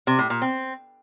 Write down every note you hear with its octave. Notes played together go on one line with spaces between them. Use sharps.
C3
A2
A#2
C4